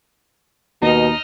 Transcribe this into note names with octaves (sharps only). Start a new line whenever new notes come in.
D#2 B2 D#4 D#5 F6